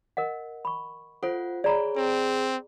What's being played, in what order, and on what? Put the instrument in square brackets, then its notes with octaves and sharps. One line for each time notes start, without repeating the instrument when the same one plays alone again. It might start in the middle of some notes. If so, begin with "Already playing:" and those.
[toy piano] A#4 D#5 F#5
B5 C#6
[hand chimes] F4 F#5 [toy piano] A4 C5
[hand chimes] G#4 C#5 [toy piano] D5 A#5 B5
[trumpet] C4 [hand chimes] G#4